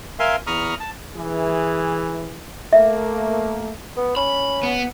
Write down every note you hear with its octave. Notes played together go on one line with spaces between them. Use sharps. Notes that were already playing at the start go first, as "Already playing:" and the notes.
A#4 E5 F5 G#5 C6
E2 A#5 B5 C#6 D#6 F6
A5
E3 G#4
A3 A#3 E5
B3
C#4 B5
B3